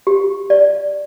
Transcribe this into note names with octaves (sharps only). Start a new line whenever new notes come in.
G4
D5